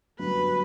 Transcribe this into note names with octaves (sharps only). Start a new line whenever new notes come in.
G2 D3 F#3 B3 B4